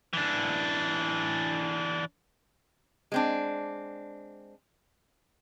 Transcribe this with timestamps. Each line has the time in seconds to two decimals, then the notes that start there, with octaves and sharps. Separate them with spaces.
0.13 E3 D4
3.12 G#3 C4 D4